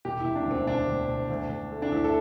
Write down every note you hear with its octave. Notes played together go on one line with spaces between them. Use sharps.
E1 G4
E1 E4
D4
D2
C4
E1 D4
D2
E1
D2
D2
A3
D4
D2 E4
A4